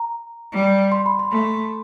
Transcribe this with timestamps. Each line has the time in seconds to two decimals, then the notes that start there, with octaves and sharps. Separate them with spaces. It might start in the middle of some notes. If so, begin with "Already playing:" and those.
Already playing: A#5
0.52 G3
0.92 C6
1.06 B5
1.19 C6
1.31 A3